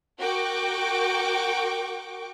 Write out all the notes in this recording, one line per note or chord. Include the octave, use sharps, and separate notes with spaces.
F#4 A#4 G5 C#6 D6